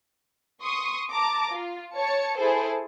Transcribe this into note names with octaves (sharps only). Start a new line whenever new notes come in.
C6 C#6 D#6
A5 A#5 D6
F4
C#5 A5 C#7
E4 G#4 A4 C5